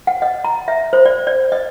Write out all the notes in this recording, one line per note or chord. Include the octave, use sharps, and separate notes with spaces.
F#5
D#5
A#5
E5
C5
D5
D5
D#5